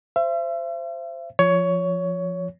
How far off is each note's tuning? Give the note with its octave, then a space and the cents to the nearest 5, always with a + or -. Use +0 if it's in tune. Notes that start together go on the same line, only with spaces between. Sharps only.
C5 +0 E5 +40
F3 -5 C#5 +15